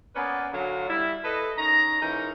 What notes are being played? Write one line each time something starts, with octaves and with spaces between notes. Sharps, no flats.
A#3 B3 C#4 B4 D5 G#5
D3 F#3 F5
G3 E4
A4 B4 D#5
F#2 D#4 C#5 A#5
G#2 E3 C#4 D#4 A#4